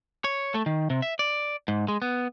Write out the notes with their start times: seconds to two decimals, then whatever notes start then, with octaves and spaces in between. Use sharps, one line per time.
0.24 C#5
0.55 A3
0.66 D#3
0.90 C3
1.02 E5
1.19 D5
1.68 G#2
1.88 G#3
2.02 B3